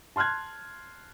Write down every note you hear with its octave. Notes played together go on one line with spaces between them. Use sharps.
A5 C6 F6 F#6 G#6